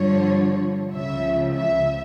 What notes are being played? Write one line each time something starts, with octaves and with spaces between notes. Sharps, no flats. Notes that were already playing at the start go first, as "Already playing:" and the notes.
Already playing: G2 D3 F3 C#5
C#2 C#3 F3 E5
E5